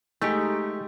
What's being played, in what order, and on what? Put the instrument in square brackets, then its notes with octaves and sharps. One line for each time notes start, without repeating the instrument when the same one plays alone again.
[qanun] G#3 D#4 C#6 [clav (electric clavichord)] A3 G4